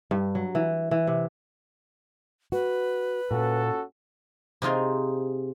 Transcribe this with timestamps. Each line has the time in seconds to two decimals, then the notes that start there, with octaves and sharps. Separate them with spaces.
0.11 G2
0.35 F#3
0.55 E3
0.91 E3
1.07 C3
2.52 F#4 B4
3.31 A#2 C#4 F#4 A4
4.62 C3 D#4 F4 G#4